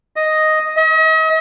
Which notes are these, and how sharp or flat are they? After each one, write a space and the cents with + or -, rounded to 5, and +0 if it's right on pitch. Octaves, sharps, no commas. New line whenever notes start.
D#5 +0
D#5 +40